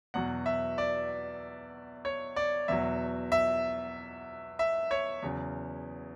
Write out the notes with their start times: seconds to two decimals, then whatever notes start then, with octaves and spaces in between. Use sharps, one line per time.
0.14 E2 B2 F#3 F#5
0.46 E5
0.78 D5
2.05 C#5
2.36 D5
2.68 E2 B2 F#3 E5
3.32 E5
4.59 E5
4.91 C#5
5.22 E2 C#3 F#3